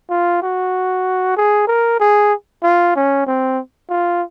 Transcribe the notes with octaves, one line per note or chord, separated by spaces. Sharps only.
F4
F#4
G#4
A#4
G#4
F4
C#4
C4
F4